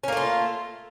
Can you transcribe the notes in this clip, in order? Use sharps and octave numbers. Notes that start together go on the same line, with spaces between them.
A3 A#3 C#4 F4